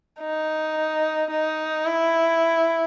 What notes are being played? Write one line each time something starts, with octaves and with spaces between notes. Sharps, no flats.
D#4
D#4
E4